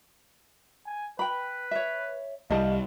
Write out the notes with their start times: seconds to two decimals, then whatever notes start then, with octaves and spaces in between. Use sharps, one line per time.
0.86 G#5
1.19 B4 G5 B5
1.71 C#5 E5
2.50 C2 G3 D#5 F5 A5